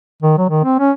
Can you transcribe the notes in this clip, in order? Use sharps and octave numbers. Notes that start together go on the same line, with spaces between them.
D#3
F#3
D#3
C4
C#4